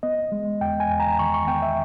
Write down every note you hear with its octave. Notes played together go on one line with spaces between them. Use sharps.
B3 D#5
G#3
E2 G5
G#5
E2
A#5
D#3 C#6
C#6
B3 G5
E5